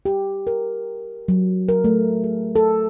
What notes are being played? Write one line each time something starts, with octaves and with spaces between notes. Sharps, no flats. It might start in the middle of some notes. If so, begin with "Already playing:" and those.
G4
A#4
F#3
A#4
A3
G#4
A4